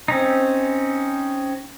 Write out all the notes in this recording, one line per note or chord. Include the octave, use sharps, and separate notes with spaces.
C4 C#4 D#4